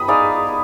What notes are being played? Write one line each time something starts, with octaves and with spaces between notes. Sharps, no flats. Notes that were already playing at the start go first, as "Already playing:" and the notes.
Already playing: B3 B5 D#6
D#4 G#4 D5 F5